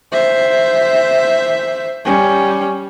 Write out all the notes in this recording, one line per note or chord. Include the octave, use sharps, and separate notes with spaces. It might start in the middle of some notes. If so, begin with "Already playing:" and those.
C5 E5
G3 C#4